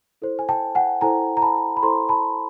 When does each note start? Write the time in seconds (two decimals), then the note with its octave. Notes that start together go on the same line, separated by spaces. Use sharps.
0.22 E4 A4 C5
0.39 G#5
0.49 G5 A5
0.75 F#5 G#5
1.01 E4 A4 C5 G#5 A#5
1.37 A#5
1.42 A5 B5
1.77 B5
1.83 E4 A4 C5 A#5 C6
2.09 A5 B5